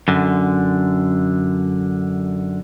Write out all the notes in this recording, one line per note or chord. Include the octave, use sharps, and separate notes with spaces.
F#2 D3